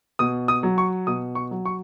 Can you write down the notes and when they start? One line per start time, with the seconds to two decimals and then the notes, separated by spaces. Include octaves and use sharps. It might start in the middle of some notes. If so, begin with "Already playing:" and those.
0.19 B2 D#6
0.48 D#6
0.63 F#3
0.78 C#6
1.07 B2 D#6
1.35 C#6
1.51 F#3
1.65 C#6